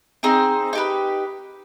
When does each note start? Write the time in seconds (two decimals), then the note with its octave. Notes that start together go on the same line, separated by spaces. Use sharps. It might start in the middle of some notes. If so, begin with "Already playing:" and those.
0.23 C4 D#4 G#4 C5
0.73 D#4 G4 B4